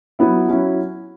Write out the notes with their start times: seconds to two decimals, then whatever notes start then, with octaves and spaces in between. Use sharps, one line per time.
0.19 F#3 B3 E4
0.48 F#3 C#4 E4